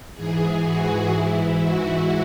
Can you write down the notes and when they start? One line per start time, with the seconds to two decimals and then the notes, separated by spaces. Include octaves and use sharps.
0.14 G#2 E3 G#4
0.63 F#4
1.11 G#2 E3 E4
1.60 F#4